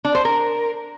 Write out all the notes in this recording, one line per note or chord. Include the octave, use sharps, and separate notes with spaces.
D4
C5
A#4